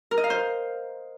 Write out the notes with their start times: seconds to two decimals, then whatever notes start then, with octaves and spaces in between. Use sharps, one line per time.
0.11 A#4
0.18 D#5
0.24 F5
0.30 C5